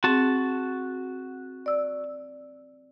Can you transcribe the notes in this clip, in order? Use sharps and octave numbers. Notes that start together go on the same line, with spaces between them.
C4 F#4 G#4 A5
D5 E6